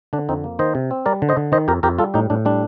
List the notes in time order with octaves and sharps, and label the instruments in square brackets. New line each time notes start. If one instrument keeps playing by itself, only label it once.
[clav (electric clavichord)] D3 D4
F2 C4 D#4
A#3
D#3 C5 D#5
C3
C4
G3 A#4 D5
D3
C5 D#5
D3
D#3 C5 D#5
F2 G4 A#4
F2 G4 A#4
G3 F4 A4
A2 D#4 G4
A2 D4
G3 D4